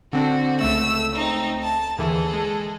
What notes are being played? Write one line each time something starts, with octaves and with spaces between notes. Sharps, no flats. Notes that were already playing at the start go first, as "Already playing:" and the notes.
D3 C4 D4 F#4
C#2 A3 E6
C4 D#4
A5
D#2 D3 E3 G#4 A4
G#3